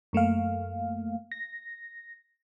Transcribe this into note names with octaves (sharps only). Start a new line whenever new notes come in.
F#2 A3 A#3 F5
A#6